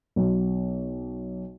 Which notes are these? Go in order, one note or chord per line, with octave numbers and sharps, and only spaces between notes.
B1